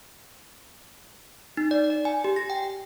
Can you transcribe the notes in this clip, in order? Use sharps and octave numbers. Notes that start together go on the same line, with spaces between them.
D#4
D5
D5
G#5
G4
A#6
G5